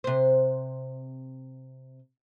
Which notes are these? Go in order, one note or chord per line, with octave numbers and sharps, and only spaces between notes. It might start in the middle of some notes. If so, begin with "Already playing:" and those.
C3 C5